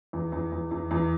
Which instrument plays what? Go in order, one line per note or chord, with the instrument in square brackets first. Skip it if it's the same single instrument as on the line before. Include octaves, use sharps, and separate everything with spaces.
[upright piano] E2
E2
E2
E2
E2